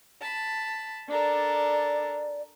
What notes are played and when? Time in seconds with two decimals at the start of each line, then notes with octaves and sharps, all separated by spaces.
0.21 A5 B5
1.09 D4 A4 A#4 D5